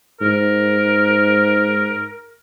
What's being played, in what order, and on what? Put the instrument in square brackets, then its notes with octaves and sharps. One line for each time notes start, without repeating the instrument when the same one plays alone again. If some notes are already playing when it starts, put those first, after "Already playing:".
[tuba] G#2 [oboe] A#4